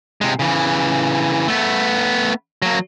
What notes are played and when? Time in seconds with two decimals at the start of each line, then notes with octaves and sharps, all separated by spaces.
0.21 C3 G#3
0.39 C#3 E3
1.48 A3 B3
2.62 F#3 A#3